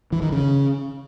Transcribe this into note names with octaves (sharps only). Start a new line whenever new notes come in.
E3
D#3
C#3